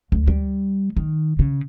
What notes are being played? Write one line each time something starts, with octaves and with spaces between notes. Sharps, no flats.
D2
G3
D#3
C#3